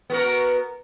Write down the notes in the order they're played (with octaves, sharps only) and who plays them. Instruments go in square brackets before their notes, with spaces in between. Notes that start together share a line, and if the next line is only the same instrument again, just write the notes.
[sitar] B3 F#4 A#4